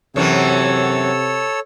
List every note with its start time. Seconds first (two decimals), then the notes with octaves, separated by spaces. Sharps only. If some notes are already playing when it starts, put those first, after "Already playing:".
0.16 F#2 C3 E3 F#3 A4 C#5 E6